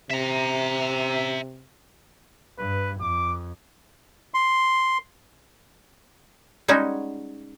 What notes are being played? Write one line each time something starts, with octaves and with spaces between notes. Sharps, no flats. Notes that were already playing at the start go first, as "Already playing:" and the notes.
C3 E5 A#5
G2 B4
F2 D6
C6
G3 G#3 C#4 D#4 F#4